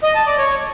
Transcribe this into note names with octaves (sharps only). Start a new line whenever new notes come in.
D#5
A5
D5
C#5